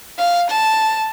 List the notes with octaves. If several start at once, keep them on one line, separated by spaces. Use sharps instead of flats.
F5
A5